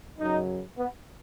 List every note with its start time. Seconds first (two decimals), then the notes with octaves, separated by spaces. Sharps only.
0.19 F#2 C#3 F#3 D#4
0.78 B3